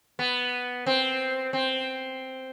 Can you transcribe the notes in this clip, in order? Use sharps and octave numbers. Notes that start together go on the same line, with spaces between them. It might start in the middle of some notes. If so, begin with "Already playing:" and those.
B3
C4
C4